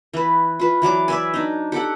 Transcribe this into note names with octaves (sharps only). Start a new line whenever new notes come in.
E3 B4
F4 B4
E3 F#3 D5 D6
D5 E5 G#5
D4 D#4
G4 A4 F#5